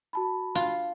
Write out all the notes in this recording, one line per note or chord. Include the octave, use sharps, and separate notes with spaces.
F#4 A5 B5
F4